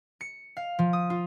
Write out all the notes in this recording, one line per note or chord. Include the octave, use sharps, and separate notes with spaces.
C#7
F5
F3
D#6
F4